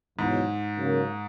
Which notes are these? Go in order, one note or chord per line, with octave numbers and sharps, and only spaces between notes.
E2 G#2 B2 F#3
C#3 F#3 A#3